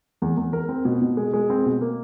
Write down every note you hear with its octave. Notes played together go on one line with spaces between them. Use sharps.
E2
E2
A#4
C4
B2
B2
G#3
G#3
C4
B2
A#3